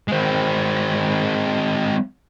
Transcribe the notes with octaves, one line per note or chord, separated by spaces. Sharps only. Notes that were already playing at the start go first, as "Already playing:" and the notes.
G#3 C4